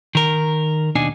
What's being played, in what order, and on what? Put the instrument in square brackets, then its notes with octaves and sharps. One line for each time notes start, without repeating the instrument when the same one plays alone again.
[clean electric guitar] D#3 A#4
D#2 B2 D4 D#4 G#5